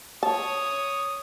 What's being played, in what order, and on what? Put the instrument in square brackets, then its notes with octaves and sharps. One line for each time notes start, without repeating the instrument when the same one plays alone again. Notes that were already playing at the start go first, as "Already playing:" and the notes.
[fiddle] C#5 [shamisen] A5 [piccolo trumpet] D#6